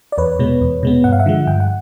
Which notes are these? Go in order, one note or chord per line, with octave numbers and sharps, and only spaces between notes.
D5
E2 B4 C#5
B2 G#3 B3
E2
B2 G#3 B3
G2 F#5
F5
E5 F#5
D3 F3 G#3
G2 G5
F#5